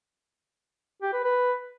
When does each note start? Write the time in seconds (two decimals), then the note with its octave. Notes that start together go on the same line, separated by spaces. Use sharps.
1.02 G4
1.13 B4
1.24 B4